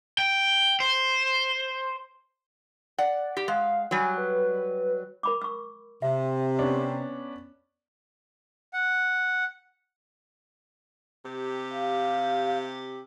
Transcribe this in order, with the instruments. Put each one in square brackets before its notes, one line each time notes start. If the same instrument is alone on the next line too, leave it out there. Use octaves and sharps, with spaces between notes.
[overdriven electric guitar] G5
C5
[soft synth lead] D5 [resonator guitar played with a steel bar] F#5
[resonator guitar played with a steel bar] G4
[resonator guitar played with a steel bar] G#3 [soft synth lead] F5
[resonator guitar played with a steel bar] F#3 G3 [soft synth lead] G#5
[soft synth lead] B4
[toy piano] A#4 B5 D6
C#6 E6
[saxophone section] C3 [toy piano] E5
[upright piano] B3 C#4 D4
[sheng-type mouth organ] F#5
[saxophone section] C3 G4
[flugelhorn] F5